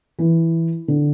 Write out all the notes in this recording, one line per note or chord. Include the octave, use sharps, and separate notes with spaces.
E3
D3